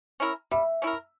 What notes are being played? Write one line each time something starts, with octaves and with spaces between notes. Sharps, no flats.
C#4 E4 A#4
G3 E5
C#4 E4 A#4